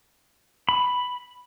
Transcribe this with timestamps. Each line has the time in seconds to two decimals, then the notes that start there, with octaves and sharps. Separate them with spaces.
0.69 B5